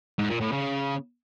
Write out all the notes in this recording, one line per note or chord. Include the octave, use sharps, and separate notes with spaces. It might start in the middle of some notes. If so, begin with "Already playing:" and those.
G#2
A#2
A2
C#3